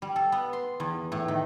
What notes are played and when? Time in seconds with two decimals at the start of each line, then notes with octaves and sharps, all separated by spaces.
0.02 G3
0.16 A4
0.32 B3
0.53 C6
0.80 E2
1.12 A2
1.28 D#3